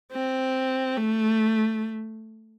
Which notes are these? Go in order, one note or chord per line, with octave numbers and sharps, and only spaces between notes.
C4
A3